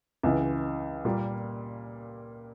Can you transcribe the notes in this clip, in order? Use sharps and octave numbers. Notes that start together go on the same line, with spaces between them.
C#2 C#3 E3
A#2 G3 A#3